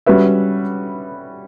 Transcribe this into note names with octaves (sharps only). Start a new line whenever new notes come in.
G3 C#4 F#4 B4 E5